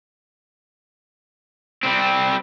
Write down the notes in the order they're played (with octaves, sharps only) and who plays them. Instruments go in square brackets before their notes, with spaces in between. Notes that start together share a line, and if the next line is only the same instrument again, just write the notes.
[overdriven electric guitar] G3 C4